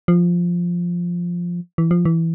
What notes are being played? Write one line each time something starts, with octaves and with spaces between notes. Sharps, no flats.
F3
E3
F3
E3